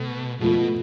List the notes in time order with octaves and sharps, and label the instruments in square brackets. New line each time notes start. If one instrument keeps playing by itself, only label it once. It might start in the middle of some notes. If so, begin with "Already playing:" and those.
Already playing: [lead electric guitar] B2 [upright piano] A3
[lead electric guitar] B2 [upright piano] F3 A3 F4 A4